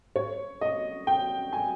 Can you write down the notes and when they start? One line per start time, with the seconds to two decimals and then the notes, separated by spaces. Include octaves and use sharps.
0.16 C#5
0.61 D#5
1.07 G5
1.53 G#5